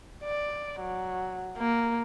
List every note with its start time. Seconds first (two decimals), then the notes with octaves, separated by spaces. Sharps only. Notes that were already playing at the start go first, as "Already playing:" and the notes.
0.23 D5
0.80 F#3
1.58 A#3